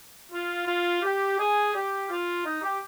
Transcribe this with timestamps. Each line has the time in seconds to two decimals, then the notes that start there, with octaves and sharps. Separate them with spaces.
0.31 F4
0.67 F4
1.02 G4
1.38 G#4
1.73 G4
2.09 F4
2.44 D#4
2.62 G4